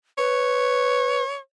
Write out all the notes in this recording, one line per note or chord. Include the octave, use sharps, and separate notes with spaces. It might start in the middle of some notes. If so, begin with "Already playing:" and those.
B4 C#5